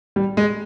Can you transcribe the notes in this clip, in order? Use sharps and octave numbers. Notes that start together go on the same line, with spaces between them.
G3
G#3